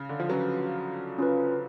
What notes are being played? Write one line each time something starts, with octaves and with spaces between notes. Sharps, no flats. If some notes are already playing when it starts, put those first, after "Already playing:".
Already playing: C#3
D3
F3
F#3 C#4 F4 B4
C#4 F4 B4